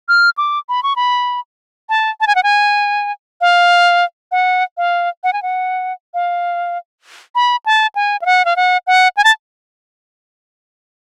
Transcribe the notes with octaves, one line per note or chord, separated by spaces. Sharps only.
F6
D6
B5
C#6
B5
A5
A5
G#5
F#5
G#5
F5
F#5
F5
F#5
G#5
F#5
F5
B5
A5
G#5
F5
F#5
F5
F#5
F#5
G#5
A5